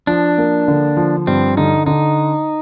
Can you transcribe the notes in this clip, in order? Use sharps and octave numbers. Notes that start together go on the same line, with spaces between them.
F3 D4
A#3
D3
F3
G2 C4
D3 D#4
D3 D#4